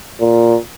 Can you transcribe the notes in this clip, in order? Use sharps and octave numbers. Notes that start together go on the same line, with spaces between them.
A#2